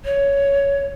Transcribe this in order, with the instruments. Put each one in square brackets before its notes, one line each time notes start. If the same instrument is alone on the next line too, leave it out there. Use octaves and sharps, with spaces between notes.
[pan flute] C#5